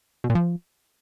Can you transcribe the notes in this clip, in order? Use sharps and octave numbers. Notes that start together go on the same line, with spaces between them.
B2
A#2
F3